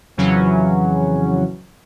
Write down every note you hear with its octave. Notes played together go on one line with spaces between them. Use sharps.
F2 C#3 E3 F#3 C#4